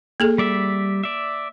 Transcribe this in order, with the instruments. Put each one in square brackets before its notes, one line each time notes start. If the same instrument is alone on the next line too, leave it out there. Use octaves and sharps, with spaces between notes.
[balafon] A#3 G#4 A4
[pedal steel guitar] G3 D5 E5
D5 E5